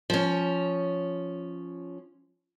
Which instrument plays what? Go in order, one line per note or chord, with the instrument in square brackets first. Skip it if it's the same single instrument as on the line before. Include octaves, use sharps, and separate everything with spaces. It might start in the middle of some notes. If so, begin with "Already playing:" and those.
[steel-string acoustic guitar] F3 C#4